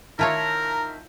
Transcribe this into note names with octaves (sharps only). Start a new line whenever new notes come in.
D#3 E4 F4 A#4 C#5 E5 A5 A#5